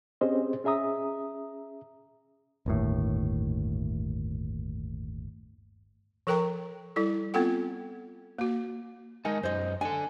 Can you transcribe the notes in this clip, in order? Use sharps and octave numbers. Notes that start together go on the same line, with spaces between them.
C4 C#4 G4 G#4 C5 D#5
C#4 G#4 E5 A#5 D#6
G1 D#2 A2
F3 A4 A#4 G5 A#5 C#6
G3 E4 A4
B3 C4 F4 A4 F#5 G5
A#3 F#4
G#3 D#4 A#4 D#5 G#5 A5
F#2 D#4 C5 D#5
D4 A4 G#5